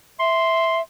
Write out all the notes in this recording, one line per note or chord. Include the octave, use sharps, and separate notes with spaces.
E5 C6